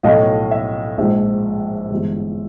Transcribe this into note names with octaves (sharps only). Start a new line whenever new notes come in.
B1 A2 F#3 A3 D#5 F5
E5
A#1 G#2 F3 G#3 E5
G1 G2 E3 G#3